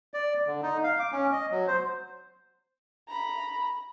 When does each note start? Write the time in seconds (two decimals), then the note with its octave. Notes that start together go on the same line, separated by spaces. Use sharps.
0.14 D5
0.47 D3
0.62 D#4
0.83 F5
0.99 D6
1.12 C#4
1.32 D#5
1.51 F#3
1.67 C5
3.08 A#5 B5